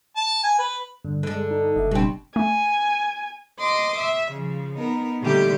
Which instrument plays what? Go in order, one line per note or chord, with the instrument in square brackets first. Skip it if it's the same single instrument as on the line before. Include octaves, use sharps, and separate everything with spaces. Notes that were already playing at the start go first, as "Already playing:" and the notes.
[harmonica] A5
G#5
B4
[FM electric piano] G2 [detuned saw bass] D3
[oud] D3 D4 [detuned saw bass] G#3
[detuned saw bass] D#4
[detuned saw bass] F#1 [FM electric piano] D#5 E5
[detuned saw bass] F#1 [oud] B2 C4 [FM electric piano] G3 D4
[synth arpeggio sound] A3 [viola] G#5
[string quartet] D#5 C6 D6 D#6
E5
C#3 F3
B3 D#4 A#4
A#2 D3 D#3 G3 A3 G4